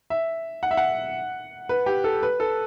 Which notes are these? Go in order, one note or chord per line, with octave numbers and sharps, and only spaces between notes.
E5
F#5
E5
F#5
B4
G4
A4
B4
A4